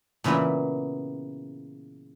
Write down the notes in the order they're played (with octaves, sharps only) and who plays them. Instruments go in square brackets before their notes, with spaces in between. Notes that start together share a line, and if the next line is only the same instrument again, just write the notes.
[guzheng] A#2 C#3 E3 B3 E4